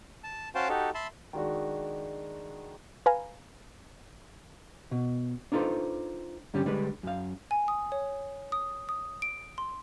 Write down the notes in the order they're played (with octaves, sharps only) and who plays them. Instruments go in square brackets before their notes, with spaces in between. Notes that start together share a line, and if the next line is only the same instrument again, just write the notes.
[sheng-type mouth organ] A5
C#4 F#4 C5 F5 G5 A5
D#4 F#4 G4 A4
E5 A5 B5 C6
[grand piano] D#3 G#3 D4 F#4
[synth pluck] B4 F5 G#5 A#5
[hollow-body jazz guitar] B2
D4 D#4 F4 A4 B4 C5
G2 D3 G3 C#4 G4
D3 G3 G#3 B4
F#2 F5
[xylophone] G#5
D#6
C#5
D#6
D#6
D7
C6